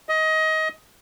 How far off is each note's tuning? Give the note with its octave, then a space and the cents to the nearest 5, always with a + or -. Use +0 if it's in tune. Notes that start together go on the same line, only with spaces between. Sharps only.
D#5 +20